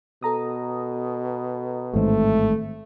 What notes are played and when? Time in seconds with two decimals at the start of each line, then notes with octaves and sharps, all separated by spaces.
0.23 B2 A4 A#5 D#6
1.94 A1 G#2 D#3 A3 C4